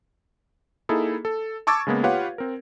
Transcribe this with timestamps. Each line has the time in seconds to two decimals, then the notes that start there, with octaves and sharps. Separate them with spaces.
0.89 A#3 D#4 E4 G#4 A4
1.25 A4
1.67 A5 C#6 D6 E6 G#6 A6
1.87 C#3 G#3 A#3 B3
2.03 F4 G4 B4 C#5 F5 F#5
2.38 C4 A#4